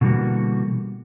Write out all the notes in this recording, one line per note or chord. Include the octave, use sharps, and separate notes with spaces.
B2 D3 E3 G3 A#3 F#4